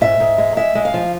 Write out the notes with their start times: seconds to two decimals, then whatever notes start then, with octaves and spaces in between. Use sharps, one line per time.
0.01 G#2 E5
0.20 G#2
0.38 G#3
0.57 G#3 E5
0.75 G#3
0.85 F5
0.94 F3